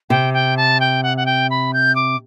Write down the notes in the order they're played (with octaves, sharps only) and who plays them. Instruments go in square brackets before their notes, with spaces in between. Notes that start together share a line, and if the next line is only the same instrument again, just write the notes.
[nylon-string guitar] C3 [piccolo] G5
[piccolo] G5
A5
G5
F#5
F#5
G5
B5
G6
D6